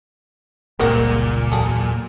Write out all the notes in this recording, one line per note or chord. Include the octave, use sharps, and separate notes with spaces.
F#1 C#2 G2 A#2 G#3 A#3 C4 F#4
E2 F#3 F#4 G#4 A4